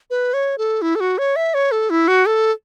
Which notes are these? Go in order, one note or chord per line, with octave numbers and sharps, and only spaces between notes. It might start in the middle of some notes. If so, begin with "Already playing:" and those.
B4
C#5
A4
E4
A4
F#4
C#5
E5
C#5
A4
E4
F#4
A4